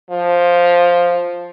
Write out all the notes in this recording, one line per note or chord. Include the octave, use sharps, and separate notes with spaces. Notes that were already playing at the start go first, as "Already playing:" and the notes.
F3